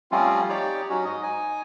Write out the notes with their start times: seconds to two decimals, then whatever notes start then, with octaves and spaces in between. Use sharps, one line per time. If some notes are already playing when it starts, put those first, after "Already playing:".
0.12 F3 G3 A3 C4 C#4 F4
0.49 D#4 G4 C#5 D5
0.90 F#3 C#4 D#4 F#4
1.05 G#2 D#5
1.23 D#4 G#5